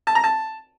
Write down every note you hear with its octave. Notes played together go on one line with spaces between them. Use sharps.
A5
A#5
A5